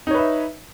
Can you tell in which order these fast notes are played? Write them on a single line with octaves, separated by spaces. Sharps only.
D#4 C#5 B4 E5